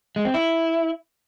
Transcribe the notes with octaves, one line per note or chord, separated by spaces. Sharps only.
G#3
C4
E4